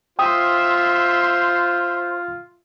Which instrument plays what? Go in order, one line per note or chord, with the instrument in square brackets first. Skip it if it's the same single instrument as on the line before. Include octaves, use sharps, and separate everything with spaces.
[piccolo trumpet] F4 [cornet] C5 [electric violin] E5 C6 [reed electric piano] G5 D#6